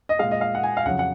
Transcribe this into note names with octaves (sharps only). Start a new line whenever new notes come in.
D#5
A#2 G#3 F5
D#5
F5
F#5
G#5
F5
F2 C#3 F#3 F#5
F#5